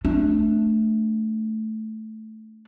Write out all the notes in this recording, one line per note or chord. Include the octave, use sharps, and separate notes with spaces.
A3 D4